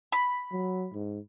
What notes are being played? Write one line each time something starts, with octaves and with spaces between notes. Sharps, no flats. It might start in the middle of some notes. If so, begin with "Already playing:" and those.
B5
F#3
G#2